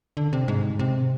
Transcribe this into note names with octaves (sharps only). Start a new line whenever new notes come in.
D3
C3
G#2
C3